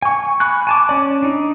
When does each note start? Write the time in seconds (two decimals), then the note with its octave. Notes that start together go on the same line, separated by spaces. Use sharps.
0.02 G#5 C#6
0.40 G#5 B5 C#6 F#6
0.67 G#5 A5 D6
0.89 C#4 D5
1.23 D4 D#4